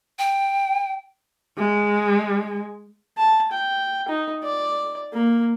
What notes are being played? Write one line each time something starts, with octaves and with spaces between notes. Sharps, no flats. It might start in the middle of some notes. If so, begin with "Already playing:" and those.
G5
G#3
A5
G5
D#4
D5
A#3